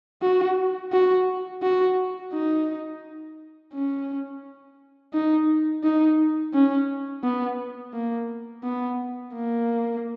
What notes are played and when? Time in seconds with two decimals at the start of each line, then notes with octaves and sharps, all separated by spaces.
0.22 F#4
0.93 F#4
1.63 F#4
2.33 D#4
3.74 C#4
5.14 D#4
5.84 D#4
6.54 C#4
7.24 B3
7.94 A#3
8.64 B3
9.35 A#3